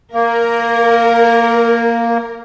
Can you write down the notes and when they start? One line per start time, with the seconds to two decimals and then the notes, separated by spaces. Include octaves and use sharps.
0.13 A#3 A#4